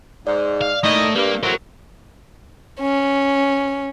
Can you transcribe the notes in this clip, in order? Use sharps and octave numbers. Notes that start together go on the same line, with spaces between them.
G#2 D5
F5
D#3 A3 A#3 E4 D#5
G2 A#3
A2 D3 F#3 A#4 C5
C#4